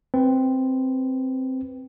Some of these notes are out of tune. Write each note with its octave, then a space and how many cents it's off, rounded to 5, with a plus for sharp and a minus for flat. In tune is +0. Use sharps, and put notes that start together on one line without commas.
C4 +0 B4 +5